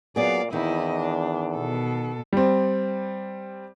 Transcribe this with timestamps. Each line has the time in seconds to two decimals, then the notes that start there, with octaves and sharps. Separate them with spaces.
0.16 A#2 F#3 B3 G#4 D5 F5
0.53 E2 D#3 C4 E4 D#5
1.00 D4
1.54 B2 A4
2.33 G3 C4